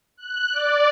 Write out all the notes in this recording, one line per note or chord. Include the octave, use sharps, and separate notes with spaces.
F#6
D5